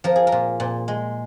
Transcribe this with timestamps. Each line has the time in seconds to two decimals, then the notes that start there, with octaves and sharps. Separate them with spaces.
0.04 F3 A#4
0.16 G#4
0.27 A#4
0.32 A#2
0.60 A#2
0.88 G#3